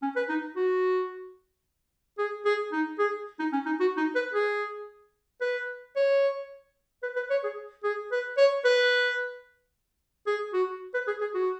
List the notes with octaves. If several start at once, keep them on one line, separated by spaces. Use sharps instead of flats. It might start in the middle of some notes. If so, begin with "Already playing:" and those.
C#4
B4
D#4
F#4
G#4
G#4
D#4
G#4
D#4
C#4
D#4
F#4
D#4
B4
G#4
B4
C#5
B4
B4
C#5
G#4
G#4
B4
C#5
B4
G#4
F#4
B4
G#4
G#4
F#4